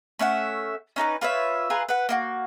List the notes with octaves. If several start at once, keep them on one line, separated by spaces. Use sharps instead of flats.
A3 C#4 E5 F#5
C#4 D#4 A4 B4
F4 B4 C#5 E5
F4 G#4 A#4 B4
B4 F#5
A#3 D#4 F#4